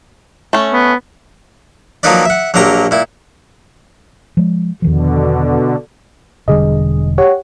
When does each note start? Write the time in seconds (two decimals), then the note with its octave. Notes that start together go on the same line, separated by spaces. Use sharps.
0.53 A3 C#4
0.73 B3
2.03 F3 F#3 A#3 D#4 B4 D5
2.25 E5 F#5
2.54 A#1 F#3 A#3 G4 A#5
2.91 A#2 E4
4.37 F3 G#3
4.82 E2 B2 D3 D#3 F3
6.48 E1 D3 G3 G#4 D#5
7.18 G4 C#5 F#5